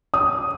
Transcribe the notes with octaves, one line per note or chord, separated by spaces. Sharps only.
D#6